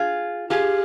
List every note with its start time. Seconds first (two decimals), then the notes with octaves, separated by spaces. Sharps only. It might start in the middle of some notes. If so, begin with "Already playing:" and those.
Already playing: F4 G#4
0.50 F4 G4 G#4